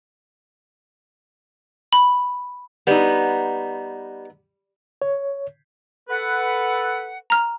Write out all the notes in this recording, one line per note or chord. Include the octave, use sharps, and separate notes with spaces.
B5
G3 B3 D#4
C#5
A4 B4 F#5
A#5 F6